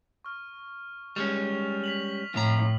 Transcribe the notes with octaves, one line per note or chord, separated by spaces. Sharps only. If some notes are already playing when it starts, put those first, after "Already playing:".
C#6 F6
G3 G#3 C#4 C#6 F6 F7
B6 F7 F#7
F2 A2 A#5